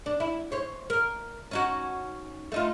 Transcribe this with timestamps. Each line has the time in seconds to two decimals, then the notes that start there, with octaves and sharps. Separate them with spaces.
0.06 D4
0.20 E4
0.52 C5 C#5
0.90 A#4
1.51 C#4 D#4 F#4
2.52 A3 D#4 F4